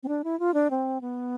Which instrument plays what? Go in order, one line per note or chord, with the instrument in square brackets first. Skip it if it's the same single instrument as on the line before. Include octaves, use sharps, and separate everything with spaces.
[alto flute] C4
D4
E4
F4
D4
C4
B3